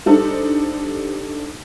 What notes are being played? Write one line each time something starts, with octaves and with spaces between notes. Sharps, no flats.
G3 D4 D#4 A4 C5